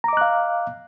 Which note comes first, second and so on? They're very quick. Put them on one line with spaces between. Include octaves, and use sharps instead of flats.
A#5 D6 D#5 F#6 F5